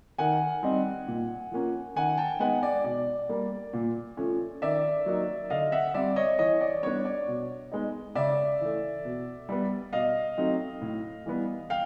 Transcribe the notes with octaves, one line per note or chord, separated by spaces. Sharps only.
D#3 F#5 G#5
G3 C4 D#4
A#2
F3 A#3 C#4
D#3 F#5 G#5
G5 A5
G#3 B3 D#4 F#5 G#5
D5
B2 D5
G3 A#3
A#2
F3 A3 C#4
D#3 D5 E5
F#3 A#3 D#4
D3 D#5 F5
E5 F#5
G3 C4 D5 E5
C#5 D#5
E3 C#5 D#5
D5
G3 B3 D4 C#5
D5
B2
G#3 B3 D#4
C#3 D5 E5
E3 A3
B2
G3 B3
B2 D#5 F5
F#3 A3 C4 D#4
A2
E3 G3 B3
F5 G5